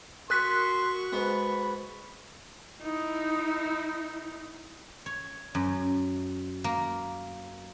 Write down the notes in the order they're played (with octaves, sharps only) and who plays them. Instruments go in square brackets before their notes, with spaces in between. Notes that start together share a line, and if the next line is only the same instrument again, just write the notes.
[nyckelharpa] F#4 C#6 [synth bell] A#4 F#6 B6 [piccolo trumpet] C6
[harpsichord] G#2 B3 [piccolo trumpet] B5
[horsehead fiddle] D#4 E4
[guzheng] C#5
F#2
A#3